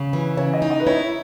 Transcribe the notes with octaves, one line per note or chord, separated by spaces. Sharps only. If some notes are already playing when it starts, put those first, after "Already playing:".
Already playing: C#3
E3
C#3 C#5
D#5
D#4
D#5
B4
E4 C#5